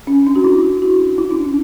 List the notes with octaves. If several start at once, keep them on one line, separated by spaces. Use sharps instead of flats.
C#4
D4
F#4
E4
F#4
E4
D4
C#4